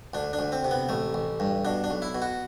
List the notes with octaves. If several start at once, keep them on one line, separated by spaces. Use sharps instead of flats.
D2 D4
D4
D2
C4
C3
B3
A1 A3
A1
G2
B2 D4
D4
B1
E4
B2
F#4